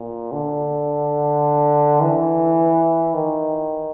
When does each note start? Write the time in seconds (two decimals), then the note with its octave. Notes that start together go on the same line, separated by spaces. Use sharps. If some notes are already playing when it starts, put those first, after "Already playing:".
Already playing: A#2
0.32 D3
2.02 E3
3.14 D#3